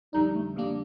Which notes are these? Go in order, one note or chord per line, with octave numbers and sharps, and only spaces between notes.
F2 D3 G3 D4 D#4
A3
F2 D3 G3 A#3 D4